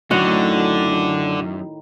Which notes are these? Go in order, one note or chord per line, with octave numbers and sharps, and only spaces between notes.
F#2 A2 D3 D#3 F#4